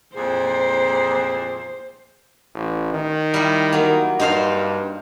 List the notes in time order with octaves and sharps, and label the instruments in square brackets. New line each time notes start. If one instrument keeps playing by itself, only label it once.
[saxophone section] F2 A#2 G#4 [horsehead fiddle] C5
[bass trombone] A1
D#3
[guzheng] G3 E4
F#3 A#3
[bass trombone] G2 [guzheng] D#4 C5 F5